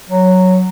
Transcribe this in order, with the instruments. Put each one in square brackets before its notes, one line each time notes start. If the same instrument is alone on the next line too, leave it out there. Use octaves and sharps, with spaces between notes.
[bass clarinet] F#3